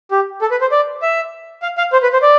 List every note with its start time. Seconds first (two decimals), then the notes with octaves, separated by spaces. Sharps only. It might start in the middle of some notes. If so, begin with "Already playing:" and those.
0.11 G4
0.42 A4
0.51 B4
0.61 C5
0.72 D5
1.02 E5
1.62 F5
1.78 F5
1.93 C5
2.03 B4
2.13 C5
2.22 D5